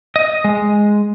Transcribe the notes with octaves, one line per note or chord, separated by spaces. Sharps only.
D#5
G#3